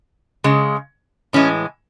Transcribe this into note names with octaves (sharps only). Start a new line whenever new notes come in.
C#3 G#3
A2 E3 G#3 C#4